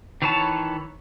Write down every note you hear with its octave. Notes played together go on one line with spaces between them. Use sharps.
D#3 E3 B4 C#5 A5